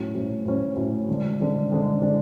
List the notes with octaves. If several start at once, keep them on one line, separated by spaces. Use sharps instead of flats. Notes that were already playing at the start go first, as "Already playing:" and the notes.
Already playing: A2 F#3 C#4
A2 F#3 C#4
A2 F#3 C#4
A2 F#3 C#4
D3 G#3 D4
D3 G#3 D4
D3 G#3 D4
D3 G#3 D4